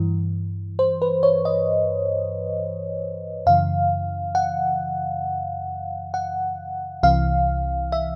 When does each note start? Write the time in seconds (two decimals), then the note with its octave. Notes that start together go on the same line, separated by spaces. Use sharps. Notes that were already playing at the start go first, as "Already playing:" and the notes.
Already playing: G2 E3
0.79 C5
1.02 B4
1.23 C#5
1.45 D#5
3.46 F#2 C#3 E3 F5
4.35 F#5
6.14 F#5
7.03 C2 C3 E3 F5
7.92 E5